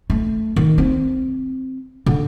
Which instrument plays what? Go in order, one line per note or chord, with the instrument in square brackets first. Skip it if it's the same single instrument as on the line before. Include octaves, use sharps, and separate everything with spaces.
[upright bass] A3
D#3
C4
D3